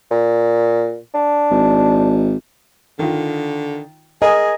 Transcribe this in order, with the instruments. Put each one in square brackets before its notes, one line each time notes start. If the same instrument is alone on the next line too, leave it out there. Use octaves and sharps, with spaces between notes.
[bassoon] A#2
D4
[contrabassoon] G#1
[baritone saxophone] D3 [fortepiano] D#3 F4
[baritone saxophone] G#4 [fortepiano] A#4 G#5 [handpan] D#5